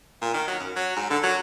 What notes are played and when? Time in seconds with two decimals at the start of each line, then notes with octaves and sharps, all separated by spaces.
0.22 A#2
0.34 D#3
0.47 F#3
0.59 F#2
0.76 F#3
0.96 G#2
1.10 D3
1.23 F#3